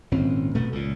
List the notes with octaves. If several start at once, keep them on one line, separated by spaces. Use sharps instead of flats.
G#1 A#2 C4 C#4
F1 B2 A3 B3
C#2 A#2